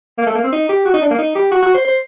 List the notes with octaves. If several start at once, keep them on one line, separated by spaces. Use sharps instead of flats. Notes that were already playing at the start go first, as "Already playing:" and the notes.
A#3
A3
A#3
C4
D#4
G4
F#4
D#4
D4
A#3
D#4
G4
F#4
F#4
C5
C5